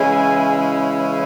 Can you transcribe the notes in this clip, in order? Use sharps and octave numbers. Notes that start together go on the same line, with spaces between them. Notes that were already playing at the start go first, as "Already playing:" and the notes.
Already playing: C#3 E3 G#3 C#4 E4 G#5